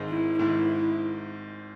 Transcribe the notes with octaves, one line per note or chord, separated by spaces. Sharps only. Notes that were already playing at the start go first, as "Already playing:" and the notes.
Already playing: G#1 G#2 D#3 G#3
E4
G#1 G#2 D#3 G#3 E4